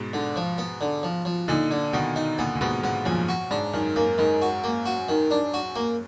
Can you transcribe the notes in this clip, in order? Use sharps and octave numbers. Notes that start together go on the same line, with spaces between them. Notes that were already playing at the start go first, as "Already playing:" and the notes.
Already playing: G#2 B2
D3
F3
B3
D3
F3
F3
A#2 D3 D#4
D3
B2 D#3 B3
D#4
A#2 D3 B3
A#2
G#2 B2 B3
G#2 B3
F#2 A#2 F3
F#4
G#2 D4
F#2 D#3
F#2 A#3
G#2 D#3
F#4
A#3
F#4
D#3
D4
F#4
A#3